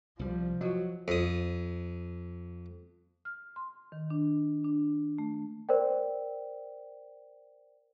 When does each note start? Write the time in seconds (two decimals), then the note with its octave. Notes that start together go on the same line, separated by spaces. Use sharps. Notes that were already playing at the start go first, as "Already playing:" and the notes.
0.19 C2 F3 G3
0.61 F#3 F4 F#4 D#5
1.08 F2 D#6
3.25 F6
3.56 C6
3.92 D#3
4.10 D4
4.64 D4
5.18 A3
5.69 A#4 C5 D5 G5